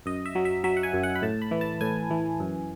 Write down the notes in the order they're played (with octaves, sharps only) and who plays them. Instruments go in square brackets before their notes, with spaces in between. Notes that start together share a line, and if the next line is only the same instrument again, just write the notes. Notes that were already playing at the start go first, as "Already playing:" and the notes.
[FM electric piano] F#2 D#5
E5
F#3
E5
F#3 E5
F#5
G#5
F#2
F#5
B5
A2 A5
B5
E3
A5
A2 G#5
E3
F#2